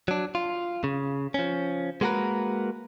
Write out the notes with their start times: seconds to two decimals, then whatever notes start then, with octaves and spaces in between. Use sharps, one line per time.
0.08 F#3 D4
0.35 F4
0.84 C#3
1.34 F3 C#4
2.01 G#3 A#3 F#4 G#4 A#4 B4